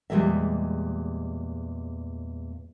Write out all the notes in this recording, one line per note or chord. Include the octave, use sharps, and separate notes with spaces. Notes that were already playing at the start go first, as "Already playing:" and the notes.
E2 A#2 G3 G#3 D#5 E5